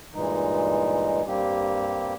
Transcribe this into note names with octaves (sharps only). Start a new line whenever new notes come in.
G2 A#2 E3 G#3 D#4
G2 G3 A#3 C4 G4